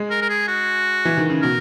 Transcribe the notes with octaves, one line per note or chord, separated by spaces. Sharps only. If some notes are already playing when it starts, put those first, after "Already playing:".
Already playing: G#3
A#4
A#4
G#4
F#4
E3
D#3
C#3
B2 A#4